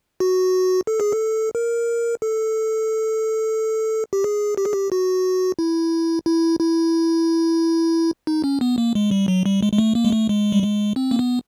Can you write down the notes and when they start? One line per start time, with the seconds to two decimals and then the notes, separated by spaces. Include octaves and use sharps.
0.20 F#4
0.87 A4
1.00 G#4
1.12 A4
1.55 A#4
2.22 A4
4.13 G4
4.24 G#4
4.57 G4
4.65 G#4
4.73 G4
4.92 F#4
5.59 E4
6.26 E4
6.60 E4
8.27 D#4
8.44 C#4
8.61 B3
8.78 A#3
8.95 G#3
9.11 G3
9.28 F#3
9.46 G3
9.63 G#3
9.73 G#3
9.78 A3
9.95 A#3
10.05 G#3
10.12 A3
10.29 G#3
10.52 G3
10.63 G#3
10.96 C4
11.11 A#3
11.19 B3